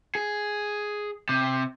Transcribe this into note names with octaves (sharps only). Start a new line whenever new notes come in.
G#4
C3